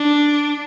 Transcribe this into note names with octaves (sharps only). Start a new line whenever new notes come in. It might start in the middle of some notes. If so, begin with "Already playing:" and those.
Already playing: D4